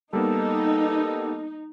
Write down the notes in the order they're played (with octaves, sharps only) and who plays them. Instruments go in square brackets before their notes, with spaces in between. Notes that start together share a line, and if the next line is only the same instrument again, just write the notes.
[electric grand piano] G3 A#3 B3 [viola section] D#4 [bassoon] A4